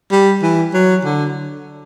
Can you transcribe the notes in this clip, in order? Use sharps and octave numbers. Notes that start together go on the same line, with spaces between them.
G3
E3
F#3
D3